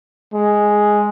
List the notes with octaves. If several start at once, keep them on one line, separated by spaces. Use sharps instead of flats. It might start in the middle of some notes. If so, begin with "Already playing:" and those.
G#3